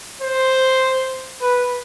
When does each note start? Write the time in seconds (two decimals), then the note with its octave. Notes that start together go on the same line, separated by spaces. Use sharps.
0.21 C5
1.41 B4